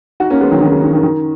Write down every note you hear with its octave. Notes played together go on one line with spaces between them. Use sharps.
D#4 F#4
A#3 C#4
G#3 B3
D#3 F#3
D#3
C#3
D#3
D#3
D#3